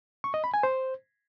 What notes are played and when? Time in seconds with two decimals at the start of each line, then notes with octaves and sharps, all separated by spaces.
0.24 C#6
0.34 D#5
0.44 B5
0.54 G#5
0.63 C5